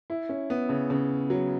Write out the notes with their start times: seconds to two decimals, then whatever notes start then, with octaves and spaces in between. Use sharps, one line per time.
0.10 E4
0.29 C#4
0.50 B3
0.69 C#3
0.90 C#3
1.30 F#3